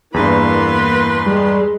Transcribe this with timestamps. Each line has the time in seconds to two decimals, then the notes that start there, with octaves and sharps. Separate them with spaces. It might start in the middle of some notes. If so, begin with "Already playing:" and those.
0.14 E2 G2 E3 A#3 B3 B4 C6
1.26 G3 G#3